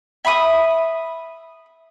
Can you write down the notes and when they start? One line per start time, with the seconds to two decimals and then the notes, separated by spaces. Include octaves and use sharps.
0.25 E5 B5 C6 D#6